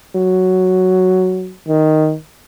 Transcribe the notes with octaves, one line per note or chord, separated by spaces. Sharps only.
F#3
D#3